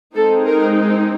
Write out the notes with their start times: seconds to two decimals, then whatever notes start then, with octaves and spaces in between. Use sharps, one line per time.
0.15 G#3 C4 D#4 A4
0.46 A#4